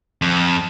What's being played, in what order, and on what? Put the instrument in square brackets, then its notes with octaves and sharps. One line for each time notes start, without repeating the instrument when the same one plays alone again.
[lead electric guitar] F2